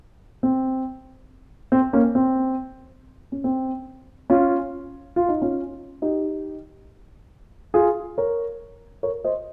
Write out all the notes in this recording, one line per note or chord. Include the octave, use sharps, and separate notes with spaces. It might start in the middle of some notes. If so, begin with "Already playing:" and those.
C4
C4
A#3 C#4
C4
C#4
C4
C#4 F4
F4
D#4
C#4 F4
D#4 G4
F4 G#4
A#4 C#5
A#4 C#5
C5 D#5